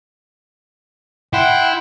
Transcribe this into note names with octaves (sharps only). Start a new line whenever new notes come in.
E4 F#5 G5 C6